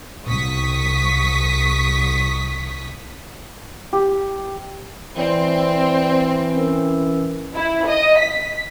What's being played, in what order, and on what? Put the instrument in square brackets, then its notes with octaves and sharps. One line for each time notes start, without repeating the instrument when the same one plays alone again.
[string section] C2 C#6 D#6 B6
[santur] G4
[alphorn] E3 [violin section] C4 [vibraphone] D5
[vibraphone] C#4 A#4 E6
[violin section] E4
D#5
B6